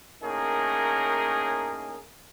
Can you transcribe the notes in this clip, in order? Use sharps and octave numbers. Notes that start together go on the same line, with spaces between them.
A2 A#3 C#4 D#4 G#4 A#4